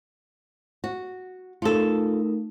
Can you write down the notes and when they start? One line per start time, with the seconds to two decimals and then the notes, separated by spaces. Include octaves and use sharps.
0.84 F#4
1.62 A3 D#4 F4 A4 A#4